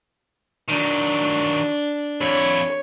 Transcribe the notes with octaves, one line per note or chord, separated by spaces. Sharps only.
D#3 F#3 D4
F2 E4 C#5